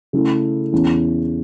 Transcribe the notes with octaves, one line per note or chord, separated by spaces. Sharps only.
C#3 A3 E4 A4
E2 E3 C#4